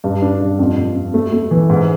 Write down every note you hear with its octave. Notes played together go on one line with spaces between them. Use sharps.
G2
D4
G2
F2
F2
F2
A3
A3
E3
G#2